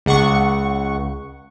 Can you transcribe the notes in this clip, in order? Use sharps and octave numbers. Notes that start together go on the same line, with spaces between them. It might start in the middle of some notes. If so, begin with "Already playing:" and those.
C#2 F#5 C#6